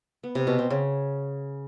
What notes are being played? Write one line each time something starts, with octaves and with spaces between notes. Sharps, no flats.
B3
C3
B2
C4
C#3